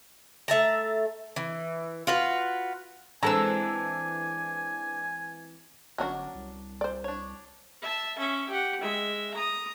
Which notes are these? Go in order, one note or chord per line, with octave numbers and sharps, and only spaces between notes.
A3 E5 A5 A#5
E3
F4 F#4 B4
E3 G#3 C4 D4 A4 G#5 A#5 E6
G1 F#3 C#4 D4 F#4 A#4
C2
C5 D5
D4 C#5
E5 A5
C#4 E5
G4 F#5
G#3 E5
A#5 D#6